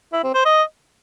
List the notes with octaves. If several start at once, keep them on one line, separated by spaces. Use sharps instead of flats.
E4
C4
C5
D#5